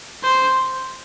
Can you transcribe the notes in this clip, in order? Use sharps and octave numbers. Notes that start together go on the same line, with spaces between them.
C5